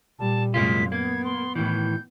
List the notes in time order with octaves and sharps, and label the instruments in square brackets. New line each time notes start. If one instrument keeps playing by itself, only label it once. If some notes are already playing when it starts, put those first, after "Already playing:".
[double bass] A#2 G3 [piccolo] A5
[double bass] F#2 C3 [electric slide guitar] G#3 A#3 F4 [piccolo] B6
[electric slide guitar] A#3 [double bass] B3 [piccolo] G#6
[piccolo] C6
[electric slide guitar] A2 D#3 E3 [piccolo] G6